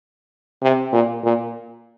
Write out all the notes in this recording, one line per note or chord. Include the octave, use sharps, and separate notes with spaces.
C3
A#2
A#2